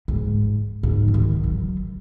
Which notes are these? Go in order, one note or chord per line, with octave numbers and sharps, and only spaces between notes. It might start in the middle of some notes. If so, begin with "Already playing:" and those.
G#2
G#2
F#3
D#3
F#3